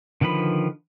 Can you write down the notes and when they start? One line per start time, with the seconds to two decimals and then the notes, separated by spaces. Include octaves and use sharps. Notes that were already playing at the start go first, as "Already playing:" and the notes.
0.21 D3 D#3 F3 B4 B5